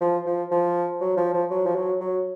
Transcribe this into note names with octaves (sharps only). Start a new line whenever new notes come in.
F3
F3
F3
F#3
F3
F3
F#3
F3
F#3
F#3